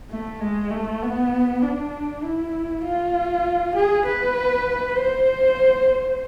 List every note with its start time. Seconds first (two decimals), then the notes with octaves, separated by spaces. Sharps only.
0.10 A3
0.41 G#3
0.71 A3
1.02 B3
1.62 D4
2.24 E4
2.84 F4
3.75 G#4
4.06 B4
4.97 C5